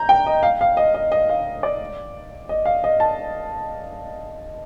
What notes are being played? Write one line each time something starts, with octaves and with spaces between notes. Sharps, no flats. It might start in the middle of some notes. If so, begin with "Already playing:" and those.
Already playing: A#5 G6
G5
D#5
F5
F5
D#5
D#5
D#5
F5
D5
D#5
F5
D#5
A5